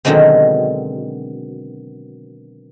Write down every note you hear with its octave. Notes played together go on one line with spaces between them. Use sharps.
B2 D3 D#3 F#3 G#3 C4